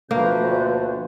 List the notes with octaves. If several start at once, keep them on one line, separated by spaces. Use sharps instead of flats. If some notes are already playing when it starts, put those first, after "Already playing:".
D2 B2 F3 A#3 B4 G6